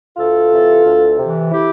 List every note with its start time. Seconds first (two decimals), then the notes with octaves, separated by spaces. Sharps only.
0.17 D2 F4 A4
0.51 C3 E3
0.85 D2
1.19 C3 E3
1.52 E4 G4